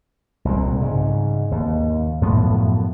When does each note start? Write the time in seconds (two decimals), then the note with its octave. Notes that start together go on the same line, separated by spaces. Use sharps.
0.45 C2 A#2
0.81 G#2 C#3
1.51 D#2
2.21 F#2 A2 F3 B3